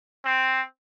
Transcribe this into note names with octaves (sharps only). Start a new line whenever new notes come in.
C4